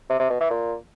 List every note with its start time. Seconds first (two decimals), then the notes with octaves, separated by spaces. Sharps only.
0.09 C3
0.20 C3
0.30 B2
0.40 E3
0.51 A#2